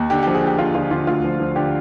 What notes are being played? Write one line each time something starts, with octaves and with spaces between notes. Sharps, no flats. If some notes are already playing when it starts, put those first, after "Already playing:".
Already playing: D#2
D3 G4
G4
F3
G#4
D#2 G4
D#2 F4
D3 F4
D3 F4
D2 F4
F3
F3
D3 G4